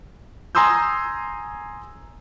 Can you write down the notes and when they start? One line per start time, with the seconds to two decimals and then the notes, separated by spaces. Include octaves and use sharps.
0.55 G#5 A#5 C6 D#6 E6 G6